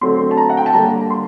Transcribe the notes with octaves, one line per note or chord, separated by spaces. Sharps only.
D3 F#3 A3 C4 C6
A5
A#5
F#5
G5
A5
D3 G3 A#3 A#5
C6